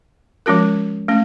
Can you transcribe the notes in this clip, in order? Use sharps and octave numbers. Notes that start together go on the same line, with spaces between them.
F3 G#3 C#4 F#4 A#4
A3 C#4